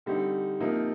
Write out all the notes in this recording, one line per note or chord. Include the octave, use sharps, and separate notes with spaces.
D3 G3 C4 D#4 G4
C3 F3 A#3 D#4